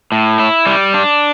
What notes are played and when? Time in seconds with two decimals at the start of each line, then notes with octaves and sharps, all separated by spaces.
0.12 A2
0.39 E4
0.66 G3
0.94 D4